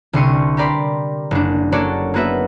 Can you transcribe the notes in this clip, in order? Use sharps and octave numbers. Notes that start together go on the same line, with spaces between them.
C2 D3 G3 C6 C#6 D#7
G4 A#4 D5 B5 C6
F#1 D4
A#3 D4 F#4 A4 C#5 D5
A#3 B3 F#4 B4 E5